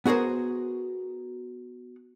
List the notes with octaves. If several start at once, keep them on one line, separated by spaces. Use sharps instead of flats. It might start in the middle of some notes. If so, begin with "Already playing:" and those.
B3 F#4 G#4 A#4 C5